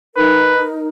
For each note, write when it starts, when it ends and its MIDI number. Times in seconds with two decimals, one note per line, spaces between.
0.16 0.89 63
0.16 0.89 70
0.16 0.63 71